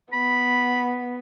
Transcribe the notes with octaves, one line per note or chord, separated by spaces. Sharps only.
B3 B5